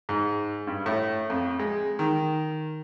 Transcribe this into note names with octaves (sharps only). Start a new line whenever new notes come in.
G#2
G2
A2
F2
G#3
D#3